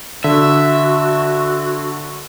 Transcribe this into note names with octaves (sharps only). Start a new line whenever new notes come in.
D3 F#4 E5